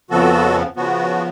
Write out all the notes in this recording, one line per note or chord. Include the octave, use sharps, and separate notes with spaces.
F2 C#3 F3 B3 F#4 A4
C#3 F3 B3 F#4